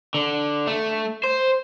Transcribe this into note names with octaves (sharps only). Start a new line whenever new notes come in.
D3
A3
C5